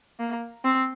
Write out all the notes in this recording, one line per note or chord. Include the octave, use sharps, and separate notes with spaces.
A#3
C4